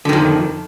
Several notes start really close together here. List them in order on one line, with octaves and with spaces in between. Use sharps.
D3 D#3 F2